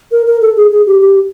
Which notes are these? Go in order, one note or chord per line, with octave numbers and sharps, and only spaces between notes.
A#4
A#4
A4
G#4
G#4
G4
G4